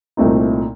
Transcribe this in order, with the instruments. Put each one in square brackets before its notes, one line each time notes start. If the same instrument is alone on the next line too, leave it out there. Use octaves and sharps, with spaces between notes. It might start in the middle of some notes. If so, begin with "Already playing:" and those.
[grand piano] C2 A#2 A3 C4 D#4